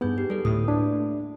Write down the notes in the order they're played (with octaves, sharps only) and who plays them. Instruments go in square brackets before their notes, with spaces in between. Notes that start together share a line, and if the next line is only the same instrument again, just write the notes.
[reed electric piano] G2 B3 [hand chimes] D#4 G#4 G6
[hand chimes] G4 B4
[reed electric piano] G3 [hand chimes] A4 B4
[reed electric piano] D2 [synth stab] A2 [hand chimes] D#6
[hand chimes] A#3 F#4 [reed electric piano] D4